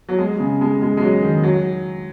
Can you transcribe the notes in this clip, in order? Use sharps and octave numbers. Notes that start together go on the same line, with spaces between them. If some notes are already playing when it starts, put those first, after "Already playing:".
F#3
G#3
C#3
G#3
G#3
G#3
F#3
D#3
F#3